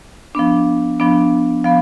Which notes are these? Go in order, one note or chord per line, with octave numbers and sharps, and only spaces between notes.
F3 B3 D4
F3 B3 D4
F3 B3 F5